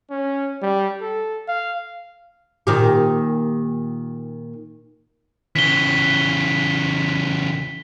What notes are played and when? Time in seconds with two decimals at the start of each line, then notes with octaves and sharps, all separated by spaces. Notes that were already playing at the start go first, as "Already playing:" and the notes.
0.11 C#4
0.62 G3
1.01 A4
1.48 F5
2.67 A#2 D#3 G4
5.56 C#3 E3 B6 G7